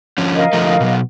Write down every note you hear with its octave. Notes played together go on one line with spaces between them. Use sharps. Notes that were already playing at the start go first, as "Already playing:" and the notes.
D3 F3 C#4
A#4 D#5 F5
D3 F3 A3
B2 F#3